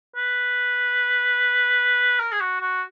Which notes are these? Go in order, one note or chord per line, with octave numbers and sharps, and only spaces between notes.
B4
A#4
G#4
F#4
F#4